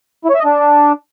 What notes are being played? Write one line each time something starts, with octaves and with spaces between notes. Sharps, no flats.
E4
C#5
E5
D#5
D4